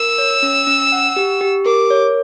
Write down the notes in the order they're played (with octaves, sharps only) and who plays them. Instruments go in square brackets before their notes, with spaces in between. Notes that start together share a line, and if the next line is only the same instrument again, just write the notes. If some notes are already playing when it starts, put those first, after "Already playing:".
Already playing: [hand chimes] A#4 [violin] E6
[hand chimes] C#5
C#4
C#4
F#5
G4
G4
[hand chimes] A#4 [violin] D6
[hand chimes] C#5